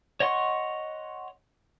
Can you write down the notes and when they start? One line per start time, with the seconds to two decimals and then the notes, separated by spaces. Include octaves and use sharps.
0.20 C#5 D#5 F#5 C6 C#6